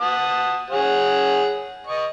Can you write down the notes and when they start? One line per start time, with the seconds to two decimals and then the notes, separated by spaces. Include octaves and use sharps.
0.01 F#5 A5 D#6
0.70 G#4 C#5 F#5
1.87 D#5 C#6